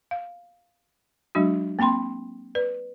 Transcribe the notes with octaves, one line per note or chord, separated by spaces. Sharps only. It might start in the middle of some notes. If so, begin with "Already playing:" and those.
F5
F#3 G#3 D4 F#4
A#3 C4 G5 B5 C6
B4 D5